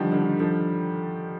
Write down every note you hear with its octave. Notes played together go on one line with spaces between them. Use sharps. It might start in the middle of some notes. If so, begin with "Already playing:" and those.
Already playing: D3 D#3 F3 G3
D3
D#3
D3 F3